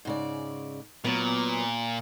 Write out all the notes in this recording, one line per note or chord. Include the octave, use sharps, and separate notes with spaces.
G#2 C#3 D5
A#2 F#3 B3